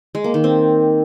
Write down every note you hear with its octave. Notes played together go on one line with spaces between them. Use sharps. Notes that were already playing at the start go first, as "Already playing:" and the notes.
G#3
A#3
D#3
C4